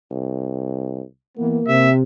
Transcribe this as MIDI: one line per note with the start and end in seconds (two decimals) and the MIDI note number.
0.11 1.02 36
1.38 1.59 52
1.38 1.88 58
1.38 1.59 59
1.67 2.03 48
1.67 1.91 76